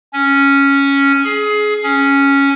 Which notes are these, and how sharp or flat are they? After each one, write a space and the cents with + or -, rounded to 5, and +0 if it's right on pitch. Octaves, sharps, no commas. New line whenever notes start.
C#4 +0
G#4 +25
C#4 +0